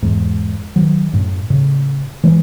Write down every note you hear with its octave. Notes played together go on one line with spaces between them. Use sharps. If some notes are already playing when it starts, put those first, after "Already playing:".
E2 G#2
D#3 F#3
F#2 A2
A2 C#3
E3 G#3